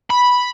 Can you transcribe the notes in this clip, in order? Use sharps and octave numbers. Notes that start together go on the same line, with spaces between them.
B5